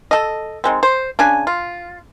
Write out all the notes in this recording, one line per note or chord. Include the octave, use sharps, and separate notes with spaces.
A4 D#5
D#3 G#3 C4
C5
C#3 D4 G#5
F4